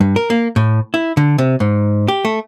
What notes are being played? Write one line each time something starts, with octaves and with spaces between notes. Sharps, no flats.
G2
A#4
A#3
A2
E4
D3
C3
G#2
G4
A3